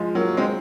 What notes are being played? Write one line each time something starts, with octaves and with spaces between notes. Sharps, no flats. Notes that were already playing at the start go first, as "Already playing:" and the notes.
Already playing: F3 G#3
F#3 A#3
G#3 C4